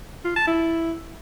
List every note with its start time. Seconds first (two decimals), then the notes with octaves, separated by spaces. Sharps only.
0.25 F4
0.36 A5
0.47 E4